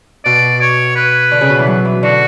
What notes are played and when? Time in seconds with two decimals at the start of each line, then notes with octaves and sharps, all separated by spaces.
0.25 B2 D5
0.61 C#5
0.96 B4
1.31 D3
1.41 C#3
1.49 B2
1.59 E3
1.67 F#3
1.85 E3
2.03 D3 F#4